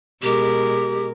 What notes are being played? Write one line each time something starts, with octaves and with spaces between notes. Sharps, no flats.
B2 G#3 G4 A#4